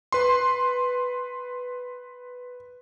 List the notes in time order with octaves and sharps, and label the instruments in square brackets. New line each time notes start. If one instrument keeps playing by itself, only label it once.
[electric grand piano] B4 C6